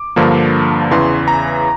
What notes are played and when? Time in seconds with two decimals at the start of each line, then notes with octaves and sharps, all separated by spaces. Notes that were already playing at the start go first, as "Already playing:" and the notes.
Already playing: D6
0.16 G2 D3 F3 A#3
0.91 E2 C#3 E3 C6
1.28 A#5